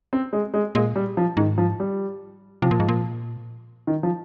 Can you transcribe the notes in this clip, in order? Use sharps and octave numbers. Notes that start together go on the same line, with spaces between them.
C4
G#3
G#3
A#2 G#3
G3
F3
G#2 D#3
F3
G3
C3 F3
A#2
G#2
A#2
D#3
F3